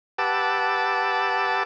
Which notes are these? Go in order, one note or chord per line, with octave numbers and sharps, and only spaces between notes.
G4 B4 F#5 A5 D6 E6